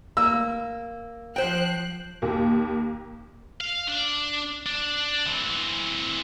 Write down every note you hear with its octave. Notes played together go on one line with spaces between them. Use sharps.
A#3 E6
F3 C5 G5 F#6
D#2 A#3
F5
D4
D4
E3 C4